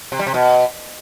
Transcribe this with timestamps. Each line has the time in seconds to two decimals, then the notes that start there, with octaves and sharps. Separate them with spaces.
0.12 C3
0.19 G3
0.27 C3
0.34 B2